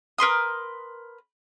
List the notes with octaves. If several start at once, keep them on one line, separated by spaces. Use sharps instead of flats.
A#4 B4 C6 D#6